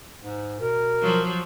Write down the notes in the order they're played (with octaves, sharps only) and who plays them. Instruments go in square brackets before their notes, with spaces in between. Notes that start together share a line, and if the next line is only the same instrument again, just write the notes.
[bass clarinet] G#2
[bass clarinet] B2 [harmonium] A#4
[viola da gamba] F3 F#3